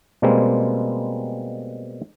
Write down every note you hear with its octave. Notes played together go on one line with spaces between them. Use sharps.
B2 G3 G#3 A#3 C4